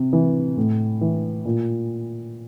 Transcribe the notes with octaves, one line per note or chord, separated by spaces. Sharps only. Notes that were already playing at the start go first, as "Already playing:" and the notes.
Already playing: C3
E3
A2
E3
A#2